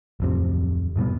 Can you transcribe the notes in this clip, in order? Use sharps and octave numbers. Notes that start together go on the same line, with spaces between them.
D1 F2 C3
G#2 B2 G3 B3